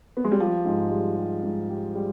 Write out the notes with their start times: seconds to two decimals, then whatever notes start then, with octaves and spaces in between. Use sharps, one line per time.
0.17 B3
0.24 G#3
0.32 G3
0.40 F3 G4
0.65 G#2
0.91 G3
1.17 G4
1.43 G#2
1.69 G4
1.95 G3